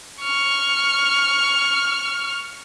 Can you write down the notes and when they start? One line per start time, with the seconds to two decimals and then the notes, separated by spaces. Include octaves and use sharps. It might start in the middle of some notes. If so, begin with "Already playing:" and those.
0.22 C#6 F6